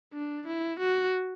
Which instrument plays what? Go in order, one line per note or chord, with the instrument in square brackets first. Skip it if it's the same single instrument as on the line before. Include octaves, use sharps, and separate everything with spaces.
[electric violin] D4
E4
F#4